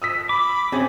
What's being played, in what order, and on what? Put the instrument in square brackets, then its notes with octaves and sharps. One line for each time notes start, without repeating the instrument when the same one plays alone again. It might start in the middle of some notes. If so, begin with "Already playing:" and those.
[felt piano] D#6 E6 B6
[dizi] B5 [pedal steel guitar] D6
[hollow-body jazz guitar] C4 C#4 G#4